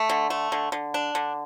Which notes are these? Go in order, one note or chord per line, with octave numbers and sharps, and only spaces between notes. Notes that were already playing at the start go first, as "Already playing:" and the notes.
Already playing: A3
D3
A3
D3
D3
D4
D3